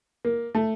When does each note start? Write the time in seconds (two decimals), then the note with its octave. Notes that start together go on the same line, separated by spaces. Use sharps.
0.25 A#3
0.55 A3